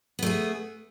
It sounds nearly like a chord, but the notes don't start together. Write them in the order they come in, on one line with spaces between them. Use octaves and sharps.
B3 A3 G#4